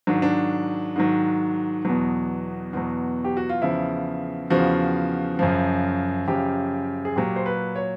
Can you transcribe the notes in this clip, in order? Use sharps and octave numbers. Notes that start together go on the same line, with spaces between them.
G#2 D#3 F#3 D4
D4
G#2 D#3 F#3
E2 B2 F#3
E2 B2 F#3
G4
F#4
F4
E2 C#3 F3 E4
E2 C#3 F3 F#4
F#2 C#3 F3
F#2 C#3 F3 G4
G#4
A#2 F#3 G4
C5
B4
C#5